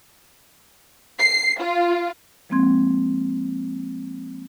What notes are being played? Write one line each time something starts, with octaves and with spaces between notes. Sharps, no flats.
C7
F4
F3 G#3 A#3 C4 C6 G#6